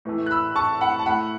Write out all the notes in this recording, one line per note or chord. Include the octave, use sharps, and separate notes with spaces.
A2 E3 A3
F#6
B5 E6
A5 C#6
F#5 B5
A5
A2 A3 F#5 B5